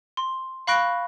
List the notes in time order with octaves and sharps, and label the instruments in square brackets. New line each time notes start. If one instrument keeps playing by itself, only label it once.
[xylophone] C6
F5 B5 C#6 F#6 A#6 D7